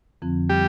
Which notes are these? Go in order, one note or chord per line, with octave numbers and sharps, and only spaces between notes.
F2 D3 F3 C4
G3 G4